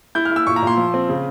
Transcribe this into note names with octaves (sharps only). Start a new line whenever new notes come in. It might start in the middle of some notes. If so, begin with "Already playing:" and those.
E4 G6
F6
E4
E6
A#2 C#6
A#5
A#2 C6
F3
C4
C#3